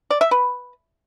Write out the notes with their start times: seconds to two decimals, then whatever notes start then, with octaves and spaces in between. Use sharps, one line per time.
0.10 D5
0.21 E5
0.31 B4